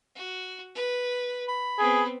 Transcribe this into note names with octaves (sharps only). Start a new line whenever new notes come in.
F#4
B4
B5
B3 C4 G#4